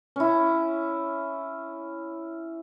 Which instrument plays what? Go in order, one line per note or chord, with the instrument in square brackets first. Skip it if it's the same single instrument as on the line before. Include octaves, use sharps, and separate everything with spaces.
[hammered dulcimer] C#4 E4